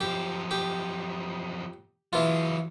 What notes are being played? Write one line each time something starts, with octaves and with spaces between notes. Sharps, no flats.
F#2 F3 G4
G4
E3 F#3 F4 G#4